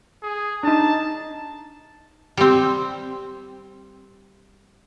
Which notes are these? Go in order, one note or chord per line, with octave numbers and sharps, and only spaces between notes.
G#4
D4 D#4 A5
G3 C4